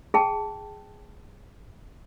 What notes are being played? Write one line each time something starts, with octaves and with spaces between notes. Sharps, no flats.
G#4 G5 A5